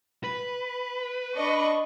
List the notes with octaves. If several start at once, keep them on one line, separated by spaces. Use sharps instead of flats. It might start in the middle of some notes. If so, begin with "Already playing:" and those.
B4
D4 D#5 C#6